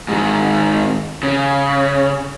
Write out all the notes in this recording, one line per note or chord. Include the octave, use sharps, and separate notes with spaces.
G#2 D#3
C#3